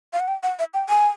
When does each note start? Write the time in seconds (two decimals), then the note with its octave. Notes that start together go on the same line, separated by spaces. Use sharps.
0.13 F5
0.20 F#5
0.28 G5
0.43 F#5
0.59 E5
0.74 G5
0.89 G#5